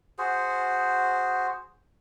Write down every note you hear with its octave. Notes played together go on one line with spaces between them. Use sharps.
F#4 G#4 C5